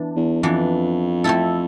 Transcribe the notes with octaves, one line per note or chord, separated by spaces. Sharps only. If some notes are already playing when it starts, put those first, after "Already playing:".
Already playing: E3 B3 D4
E2
F2 E3 B3 D4
A3 C4 E4 A4